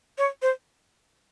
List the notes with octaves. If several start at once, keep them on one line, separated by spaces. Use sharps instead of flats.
C#5
C5